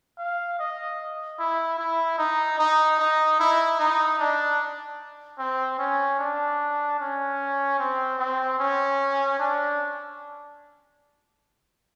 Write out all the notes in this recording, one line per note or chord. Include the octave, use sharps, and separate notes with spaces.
F5
D#5
E4
E4
D#4
D#4
D#4
E4
D#4
D4
C4
C#4
D4
C#4
C4
C4
C#4
D4